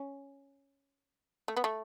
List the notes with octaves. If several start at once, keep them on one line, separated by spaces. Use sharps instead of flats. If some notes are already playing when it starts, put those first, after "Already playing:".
Already playing: C#4
A3
B3
A3